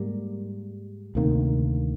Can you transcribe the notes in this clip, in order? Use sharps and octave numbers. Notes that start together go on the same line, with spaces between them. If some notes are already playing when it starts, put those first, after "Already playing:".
Already playing: G#2 G3 A#3
D2 C3 D#3 A#3